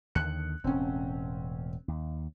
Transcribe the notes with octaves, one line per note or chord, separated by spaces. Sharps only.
D#2 D3 D#3 F#6 C#7
E1 A2 C4 C#4
D#2